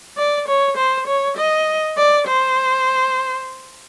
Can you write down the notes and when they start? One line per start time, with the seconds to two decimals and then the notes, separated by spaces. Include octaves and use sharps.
0.17 D5
0.48 C#5
0.77 C5
1.07 C#5
1.37 D#5
1.97 D5
2.28 C5